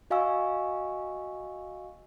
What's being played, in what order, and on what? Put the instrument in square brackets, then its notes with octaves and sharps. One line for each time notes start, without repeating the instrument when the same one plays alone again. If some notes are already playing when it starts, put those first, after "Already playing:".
[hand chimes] F#4 D#5 F5 G#5 C#6 E6